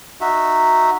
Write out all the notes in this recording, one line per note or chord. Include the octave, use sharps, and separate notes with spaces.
D#4 F#4 E5